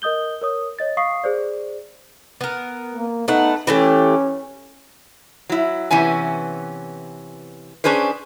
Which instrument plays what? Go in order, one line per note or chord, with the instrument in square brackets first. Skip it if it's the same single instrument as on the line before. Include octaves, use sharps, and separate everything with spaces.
[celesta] A#4 D#5 D#6 G6 G7
A#4 C#5 D#6
C#5 D#5 A6
F5 C#6 D#6 C7
G#4 C5 D5
[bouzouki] B3 A#4
[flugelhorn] A#3
[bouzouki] A3 B3 F#5 [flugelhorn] D#4
[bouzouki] E3 A3 G4 [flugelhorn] C#4
[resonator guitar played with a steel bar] F#3 E4
C3 E3 B3 C#4 G#5
C#4 D4 G#4 B4 C5